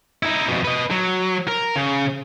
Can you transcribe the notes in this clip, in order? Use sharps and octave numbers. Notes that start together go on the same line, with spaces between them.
D#4 E4
F2 B2
B4 D#5
F#3
A#4
C#3